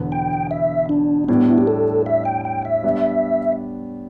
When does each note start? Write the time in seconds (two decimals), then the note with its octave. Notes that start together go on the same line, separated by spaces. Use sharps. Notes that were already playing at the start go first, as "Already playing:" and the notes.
Already playing: E1 E2 D3 B3
0.12 G5
0.51 E5
0.89 D4
1.28 A2 G3 B3 D4
1.50 E4
1.58 G4
1.67 A4
2.06 E5
2.25 G5
2.45 G5
2.65 E5
2.83 G3 B3 D4